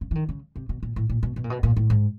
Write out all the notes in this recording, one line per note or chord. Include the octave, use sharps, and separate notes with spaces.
C#3
E3
D#3
C#3
C3
B2
A#2
A2
A#2
B2
B2
A#2
B2
A#2
A2
G#2